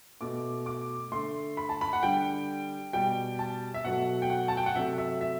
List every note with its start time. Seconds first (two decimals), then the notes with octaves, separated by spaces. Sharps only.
0.21 B2 A3 D6
0.66 D6
1.12 D3 A3 C6
1.57 B5
1.69 A5
1.81 B5
1.93 F#5
2.03 D3 G3 G5
2.93 B2 G3 G5
3.39 A5
3.74 E5
3.84 B2 F#3 A3 F#5
4.22 G5
4.30 F#5
4.48 A5
4.57 G5
4.66 F#5
4.76 C3 F#3 A3 E5
4.98 E5
5.21 E5